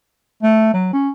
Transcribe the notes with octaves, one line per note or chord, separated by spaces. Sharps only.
A3
F#3
C#4